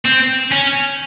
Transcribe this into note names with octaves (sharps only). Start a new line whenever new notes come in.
C4
C#4